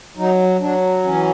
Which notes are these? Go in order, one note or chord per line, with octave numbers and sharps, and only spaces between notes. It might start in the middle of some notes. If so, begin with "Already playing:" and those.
F#3 D#4
F#3 D4
E3 C#4